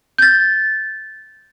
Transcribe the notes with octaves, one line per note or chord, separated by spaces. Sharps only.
G6 A6